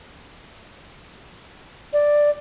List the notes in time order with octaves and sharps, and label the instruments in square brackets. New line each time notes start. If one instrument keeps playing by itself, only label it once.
[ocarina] D5